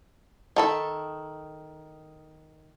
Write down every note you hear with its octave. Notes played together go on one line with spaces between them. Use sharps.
D#3 A4 B5